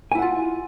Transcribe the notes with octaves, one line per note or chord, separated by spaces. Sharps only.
E4 F4 F#5 G#5